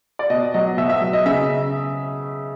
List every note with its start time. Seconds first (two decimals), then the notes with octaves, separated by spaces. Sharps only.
0.19 D5
0.30 B2 D#5
0.54 F#3 D#5
0.77 B2 E5
0.90 E5
1.01 F#3
1.13 D#5
1.26 C#3 E5